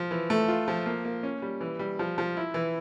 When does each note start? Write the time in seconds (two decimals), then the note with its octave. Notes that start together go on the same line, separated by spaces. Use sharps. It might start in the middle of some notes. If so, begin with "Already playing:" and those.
Already playing: F3
0.11 E3
0.30 A3
0.48 F4
0.68 F3
0.86 A#3
1.05 A#3
1.23 C#4
1.42 G3
1.61 E3
1.79 G3
1.99 F3
2.18 F3
2.37 E4
2.54 E3